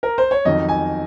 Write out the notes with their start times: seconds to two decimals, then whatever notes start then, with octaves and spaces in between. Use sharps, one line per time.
0.03 A#4
0.18 C5
0.31 C#5
0.45 F2 D#3 F#3 D#5
0.69 G#5